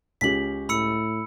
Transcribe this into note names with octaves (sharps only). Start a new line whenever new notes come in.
C#2 C#4 G4 B6 F#7
A2 B5 E6 C#7